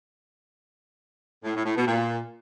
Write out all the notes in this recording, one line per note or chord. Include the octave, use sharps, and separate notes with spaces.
A2
A2
A2
B2
A#2